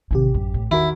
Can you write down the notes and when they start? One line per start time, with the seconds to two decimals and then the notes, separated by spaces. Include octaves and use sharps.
0.11 A1 C3 D#3 G4
0.34 F#2
0.54 A2
0.71 E2 D#3 E4 F#4 A#4